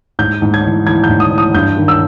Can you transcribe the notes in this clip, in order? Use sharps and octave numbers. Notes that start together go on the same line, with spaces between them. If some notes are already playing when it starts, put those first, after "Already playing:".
G#2 G6
G#2
G#6
E3
E3 G#6
G6
G#2
D#6
E3
D#6
G2 G6
D#3
E6